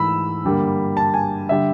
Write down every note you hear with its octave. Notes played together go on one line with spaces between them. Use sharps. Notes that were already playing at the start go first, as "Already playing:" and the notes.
Already playing: G#2 E3 A3 B5 E6
G2 D3 G3 A#3
A5
G#5
D3 G3 E5